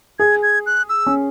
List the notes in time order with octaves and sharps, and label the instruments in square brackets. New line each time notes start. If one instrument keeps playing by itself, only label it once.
[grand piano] G#4 [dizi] G#6
[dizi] G#6
F#6
E6
[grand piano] C#4